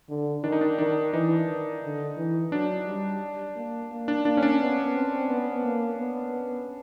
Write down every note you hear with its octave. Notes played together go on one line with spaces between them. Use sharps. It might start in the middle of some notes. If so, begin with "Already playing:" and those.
D3
D#3 D4
D#4
D4
D#3 D4
E3 D#4
D#3
D3
E3
F#3 D4
G3
A#3
A#3
D4
A#3 D4
C#4
D4
B3
C4
B3
A#3
B3